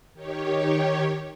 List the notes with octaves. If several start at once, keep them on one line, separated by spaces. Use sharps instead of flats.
D#3 G4 C#5